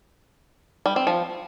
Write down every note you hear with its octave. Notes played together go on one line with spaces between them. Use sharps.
G3
C4
F3